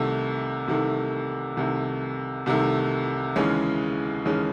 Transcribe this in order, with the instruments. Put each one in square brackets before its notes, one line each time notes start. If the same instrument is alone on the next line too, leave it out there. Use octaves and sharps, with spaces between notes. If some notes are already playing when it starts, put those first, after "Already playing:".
Already playing: [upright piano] C2 C3 D#3 A3
C2 C3 D#3 A3
C2 C3 D#3 A3
C2 C3 D#3 A3
D#2 C#3 E3 G#3 C#4
D#2 C#3 E3 G#3 C#4